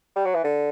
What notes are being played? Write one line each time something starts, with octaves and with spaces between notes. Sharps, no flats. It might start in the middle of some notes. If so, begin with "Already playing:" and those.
G3
F#3
E3
D3